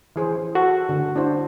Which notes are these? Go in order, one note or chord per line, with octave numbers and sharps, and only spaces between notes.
E3 G#4 C5
F#4 A4
D3
D4 E4 C5